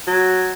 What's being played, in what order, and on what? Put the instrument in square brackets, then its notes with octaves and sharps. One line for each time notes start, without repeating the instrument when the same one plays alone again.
[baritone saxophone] F#3